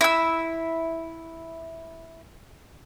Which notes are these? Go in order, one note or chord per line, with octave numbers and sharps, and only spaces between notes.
E4 E6